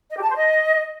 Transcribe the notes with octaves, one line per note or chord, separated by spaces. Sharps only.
D#5
G4
A5
C5
D#5